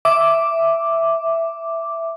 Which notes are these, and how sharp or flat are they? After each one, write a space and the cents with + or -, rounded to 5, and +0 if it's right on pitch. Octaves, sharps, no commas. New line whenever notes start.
E5 +0 D6 +0